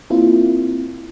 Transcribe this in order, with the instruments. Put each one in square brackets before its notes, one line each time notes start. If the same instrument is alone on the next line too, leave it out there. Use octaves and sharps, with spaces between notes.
[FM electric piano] A#3 C4 E4 F4